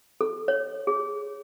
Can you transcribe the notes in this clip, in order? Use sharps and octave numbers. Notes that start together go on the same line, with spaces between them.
A4
C#5
G#4